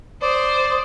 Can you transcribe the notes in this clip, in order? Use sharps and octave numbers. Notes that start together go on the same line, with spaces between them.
C5 D5 D#6